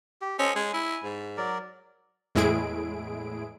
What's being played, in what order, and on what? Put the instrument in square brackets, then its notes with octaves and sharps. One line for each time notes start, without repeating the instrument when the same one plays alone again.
[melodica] G4
[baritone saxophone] C#4 [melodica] A4 C5 D#5
[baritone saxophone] G#3 [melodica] G#5
[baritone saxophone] E4
G#2
[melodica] F#3 A#4 D5
[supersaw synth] E2 A2 G#3 E4 G#4 D7